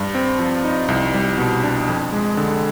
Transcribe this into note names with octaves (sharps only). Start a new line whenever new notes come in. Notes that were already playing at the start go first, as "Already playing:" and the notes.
Already playing: G2
C4
F3
D#4
C2
G3
B2
D4
F2
G#3
D3